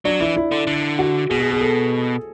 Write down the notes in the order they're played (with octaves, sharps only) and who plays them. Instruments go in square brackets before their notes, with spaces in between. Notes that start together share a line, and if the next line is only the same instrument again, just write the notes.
[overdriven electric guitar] F#3 [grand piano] D4
[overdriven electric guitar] E3 [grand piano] E4
[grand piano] E4
[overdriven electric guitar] D3
D3
[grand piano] F#4
[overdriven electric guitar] B2 [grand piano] G#4
[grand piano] G#4
G#4
A4